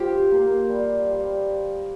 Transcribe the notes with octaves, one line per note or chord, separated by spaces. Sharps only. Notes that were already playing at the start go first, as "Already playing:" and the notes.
Already playing: F4 G4 C5
A#3
G3
G3